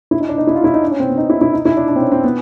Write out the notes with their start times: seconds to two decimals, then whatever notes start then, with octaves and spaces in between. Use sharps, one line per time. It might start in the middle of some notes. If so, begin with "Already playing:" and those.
0.11 E4
0.20 D#4
0.29 D4
0.38 D#4
0.47 E4
0.55 F4
0.64 E4
0.74 D#4
0.82 D4
0.91 C#4
1.00 C4
1.09 B3
1.18 D#4
1.30 E4
1.41 E4
1.53 D#4
1.65 E4
1.77 D4
1.88 D4
1.96 C4
2.01 C#4
2.12 C4
2.24 B3